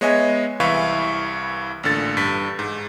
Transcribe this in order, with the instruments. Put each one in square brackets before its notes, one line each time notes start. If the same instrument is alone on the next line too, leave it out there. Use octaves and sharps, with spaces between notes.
[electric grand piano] G#3 B3 C#5 D#5 E5 G#5
C2 E3 E5 F5 B5 C#6
A1 A#2 D3 A6
G2 B6
G#2